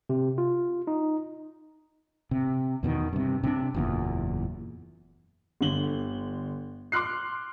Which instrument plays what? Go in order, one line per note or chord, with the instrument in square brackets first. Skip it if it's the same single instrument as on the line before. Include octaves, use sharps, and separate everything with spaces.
[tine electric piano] C3
F4
D#4
[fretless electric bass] C3
E2 B2 D3 D#3
G2 C3
C3 E3 D4
F#1 E2 A#2
[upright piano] G1 D3 F#7 G7
C6 D6 F6 F#6 C7